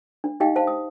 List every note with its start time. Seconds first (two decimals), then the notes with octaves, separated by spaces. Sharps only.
0.24 D4
0.40 D#4 G4 D#5 F5 G5
0.56 C5 F5 A5
0.67 D#6